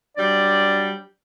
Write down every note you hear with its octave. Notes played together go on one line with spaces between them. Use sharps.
F#3 G3 D4 D5